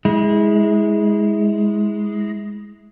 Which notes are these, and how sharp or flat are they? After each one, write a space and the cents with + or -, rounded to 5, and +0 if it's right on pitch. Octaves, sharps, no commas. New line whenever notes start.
G#3 +0 E4 -30